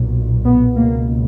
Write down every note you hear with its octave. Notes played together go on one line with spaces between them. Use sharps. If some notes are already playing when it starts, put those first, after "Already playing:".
Already playing: B1 A#2
B3
C#2 B2 A#3